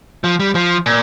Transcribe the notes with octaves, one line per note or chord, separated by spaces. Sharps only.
F3
G3
F3
A#2